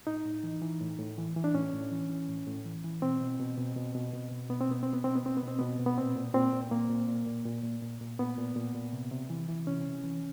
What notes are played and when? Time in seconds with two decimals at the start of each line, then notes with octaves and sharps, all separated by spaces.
0.07 A2 D#4
0.25 A2
0.43 E3
0.62 E3
0.81 A2
0.99 A2
1.18 E3
1.36 E3
1.44 D4
1.54 A2 C#4
1.73 A2
1.92 E3
2.10 E3
2.28 A2
2.47 A2
2.66 E3
2.84 E3
3.02 B2 C4
3.21 B2
3.39 B2
3.58 B2
3.76 B2
3.95 B2
4.13 B2
4.31 B2
4.49 B2 B3
4.61 C4
4.68 B2 B3
4.83 B2 C4
4.93 B3
5.04 B2 C4
5.16 B3
5.24 B2 C4
5.37 B3
5.43 B2
5.48 C4
5.59 B2 B3
5.79 B2
5.86 B3
5.98 A#2 C4
6.16 A#2
6.34 A#2 C4
6.53 A#2
6.71 A#2 A#3
6.90 A#2
7.08 A#2
7.27 A#2
7.45 A#2
7.64 A#2
7.82 A#2
8.01 A#2
8.19 A#2 B3
8.38 A#2
8.56 A#2
8.75 A#2
8.93 C3
9.12 C3
9.30 E3
9.48 E3
9.67 C3 C#4
9.85 C3
10.04 E3